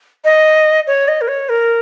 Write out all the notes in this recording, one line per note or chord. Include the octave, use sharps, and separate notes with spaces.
D#5
C#5
D#5
A#4
C#5
A#4